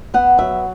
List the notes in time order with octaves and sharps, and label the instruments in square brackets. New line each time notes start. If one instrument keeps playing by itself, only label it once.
[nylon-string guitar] B3 F#5
F#3 E5